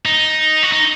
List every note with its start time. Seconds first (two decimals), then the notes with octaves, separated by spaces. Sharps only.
0.05 D#4
0.63 F#4
0.72 D#4